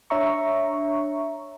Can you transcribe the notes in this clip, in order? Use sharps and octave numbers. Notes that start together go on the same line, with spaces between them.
D4 C#5 E5 A#5 C#6